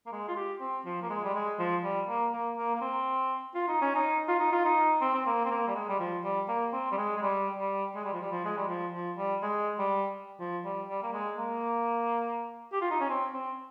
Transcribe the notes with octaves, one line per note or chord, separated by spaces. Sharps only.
A#3
G#3
F4
G4
C4
F3
A#3
G#3
G3
G#3
F3
G3
A#3
A#3
A#3
A#3
C4
F4
D#4
C#4
D#4
F4
D#4
F4
D#4
C4
C4
A#3
C4
A#3
G3
G#3
G3
F3
G3
A#3
C4
G3
G#3
G#3
G3
G3
G#3
G3
F3
G3
F3
G#3
G3
F3
F3
G3
G#3
G3
F3
G3
G3
A#3
G#3
A#3
G4
F4
D#4
C#4
C4
C4